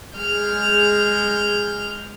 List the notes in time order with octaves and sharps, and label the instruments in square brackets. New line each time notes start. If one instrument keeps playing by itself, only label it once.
[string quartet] G#3 G#4 F6 G6